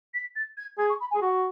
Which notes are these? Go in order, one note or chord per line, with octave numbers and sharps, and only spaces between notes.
B6
A6
G#6
G#4 G#6
C#6
B5
G#5
G#4
F#4 F#5